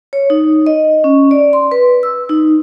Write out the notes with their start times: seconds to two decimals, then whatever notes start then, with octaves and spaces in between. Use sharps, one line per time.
0.13 C#5
0.30 D#4
0.66 D#5
1.04 C#4
1.31 D5
1.53 C6
1.71 B4
2.03 E6
2.29 D#4